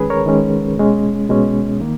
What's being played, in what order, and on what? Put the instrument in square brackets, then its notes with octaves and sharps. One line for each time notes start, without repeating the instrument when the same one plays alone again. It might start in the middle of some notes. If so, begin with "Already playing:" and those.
Already playing: [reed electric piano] D#3 G#3 C#4 G#4 B4
A#4 C#5
D#3 G#3 C#4
B2 G#3 C#4
B2 G#3 C#4
D#3 A#3